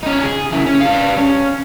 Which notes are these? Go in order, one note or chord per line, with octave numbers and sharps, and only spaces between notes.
C#4 D#4
G#4
C#3 E4
C#4
G3 F5
C#4